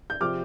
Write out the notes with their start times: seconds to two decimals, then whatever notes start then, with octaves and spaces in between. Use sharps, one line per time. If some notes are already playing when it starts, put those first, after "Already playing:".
0.10 G6
0.21 C3 F3 C4 D6 F6